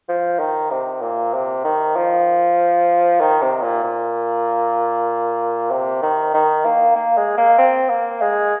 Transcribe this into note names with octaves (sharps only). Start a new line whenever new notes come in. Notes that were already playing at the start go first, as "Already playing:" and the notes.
F3
D#3
C3
A#2
C3
D#3
F3
D#3
C3
A#2
A#2
C3
D#3
D#3
A#3
A#3
G#3
A#3
C4
A#3
G#3